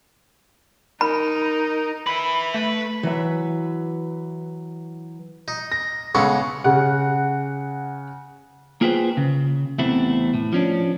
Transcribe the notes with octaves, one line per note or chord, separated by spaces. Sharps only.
D#4 A#4 B5
E4 B4 B5
A3 B4
E3 F#3 E5
D#4
A#6
C#3 G#3 B3 A4 C#6
C#3 F#5
A#3 F4 G#4 B4 C5 G5
C#3
E2 C3 E3 A3 C4 E4
A2
F3 C#4 D4